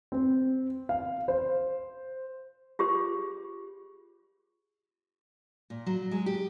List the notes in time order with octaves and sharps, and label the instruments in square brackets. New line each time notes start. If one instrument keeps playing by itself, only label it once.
[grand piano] C4
F5
C5
[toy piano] F4 G4 G#4 C5
[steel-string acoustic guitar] A#2
F#3
G#3
G4